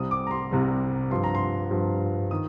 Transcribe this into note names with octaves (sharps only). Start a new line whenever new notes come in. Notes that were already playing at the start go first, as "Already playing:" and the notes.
Already playing: C2 C3 G3 D#6
D6
A#5
C6
C2 C3 G3
G2 F3 C6
A#5
C6
G2 F3
D#3 D#6